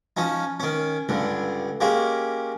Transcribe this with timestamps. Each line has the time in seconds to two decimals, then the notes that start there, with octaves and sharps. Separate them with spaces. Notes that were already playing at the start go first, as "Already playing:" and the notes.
0.17 F3 C#4 D#4
0.60 D#3 C#4
1.09 C#2 G2 D3
1.81 G#3 A#3 C#4 G4